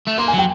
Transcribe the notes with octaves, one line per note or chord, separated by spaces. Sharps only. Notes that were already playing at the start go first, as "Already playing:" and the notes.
A3
A#3 C6
G#5
F#3 G5